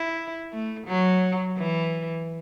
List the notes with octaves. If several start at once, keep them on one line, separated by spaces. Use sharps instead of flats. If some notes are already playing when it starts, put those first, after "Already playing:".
Already playing: E4
A3
F#3
E3